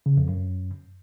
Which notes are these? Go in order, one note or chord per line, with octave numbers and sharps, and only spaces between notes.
C#3
F2
F#2